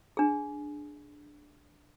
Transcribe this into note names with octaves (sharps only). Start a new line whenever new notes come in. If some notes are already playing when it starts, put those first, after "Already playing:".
D4 G#4